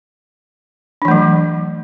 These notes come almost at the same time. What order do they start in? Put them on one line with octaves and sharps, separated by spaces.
D4 E3 A3 F#3